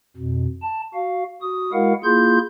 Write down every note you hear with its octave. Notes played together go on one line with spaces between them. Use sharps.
F2 B2
A5
F#4 F5
F#4 D#6
G#3 E4 F#4 A#4 F5 F#5
A#3 E4 F4 G#4 C6 G6